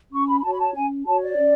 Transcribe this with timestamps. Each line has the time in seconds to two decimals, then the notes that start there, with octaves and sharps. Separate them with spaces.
0.12 C#4 C#6
0.28 B5
0.39 B5
0.43 F#4 C#5 A5
0.52 B5
0.59 A5
0.75 C#4 G#5
1.06 F#4 C#5 A5
1.22 D5
1.37 C#4